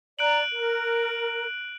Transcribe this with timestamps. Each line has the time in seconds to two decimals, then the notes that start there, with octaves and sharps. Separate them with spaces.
0.19 D5 A#5 F#6 D7 F#7
0.51 A#4